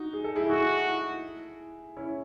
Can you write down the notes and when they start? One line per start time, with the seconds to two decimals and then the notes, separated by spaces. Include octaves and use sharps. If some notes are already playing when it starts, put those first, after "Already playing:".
Already playing: D#4 F#4
0.13 G#4
0.24 A4
0.36 E4 G#4
0.50 E4 F#4 G#4
1.97 C#4 E4